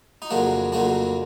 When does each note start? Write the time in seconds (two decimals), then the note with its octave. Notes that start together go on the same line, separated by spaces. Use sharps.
0.22 D#4
0.30 F2 C#3 F#3 A#3 D4
0.72 F2 C#3 F#3 A#3 D4